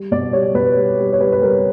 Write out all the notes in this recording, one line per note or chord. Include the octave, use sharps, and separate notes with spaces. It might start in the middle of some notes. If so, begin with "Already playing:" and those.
Already playing: G3
B2 D5
G3 C#5
B2 B4
G3
G3
C#5
G3 B4
B4
G3 A#4